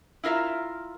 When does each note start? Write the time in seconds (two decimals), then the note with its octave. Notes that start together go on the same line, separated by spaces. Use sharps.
0.24 E4 F4 A#4 E5